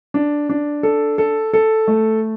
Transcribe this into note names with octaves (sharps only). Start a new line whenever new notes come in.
D4
D4
A4
A4
A4
A3